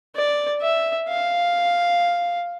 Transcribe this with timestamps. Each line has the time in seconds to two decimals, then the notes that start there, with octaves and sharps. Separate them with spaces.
0.16 D5
0.62 E5
1.08 F5